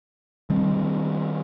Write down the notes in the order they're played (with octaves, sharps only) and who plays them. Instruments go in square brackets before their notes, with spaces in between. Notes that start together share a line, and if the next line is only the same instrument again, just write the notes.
[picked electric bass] D#3 G3 C4